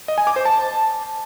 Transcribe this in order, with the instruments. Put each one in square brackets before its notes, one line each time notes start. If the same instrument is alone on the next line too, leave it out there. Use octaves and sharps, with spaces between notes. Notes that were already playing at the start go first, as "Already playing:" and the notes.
[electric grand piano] D#5
G#5
D6
C5
A5